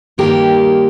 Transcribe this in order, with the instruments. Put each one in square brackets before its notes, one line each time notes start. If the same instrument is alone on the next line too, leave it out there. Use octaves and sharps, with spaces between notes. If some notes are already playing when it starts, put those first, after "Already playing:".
[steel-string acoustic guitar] G2 D#3 A#3 G4 A#4